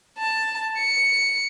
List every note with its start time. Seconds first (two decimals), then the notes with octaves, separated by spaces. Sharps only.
0.18 A5
0.77 C#7